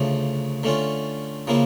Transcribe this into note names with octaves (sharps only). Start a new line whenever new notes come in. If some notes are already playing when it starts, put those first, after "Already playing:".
Already playing: D2 C#3 F3 A3
D3 A3 C#4 F4
C#3 F3 A#3 E4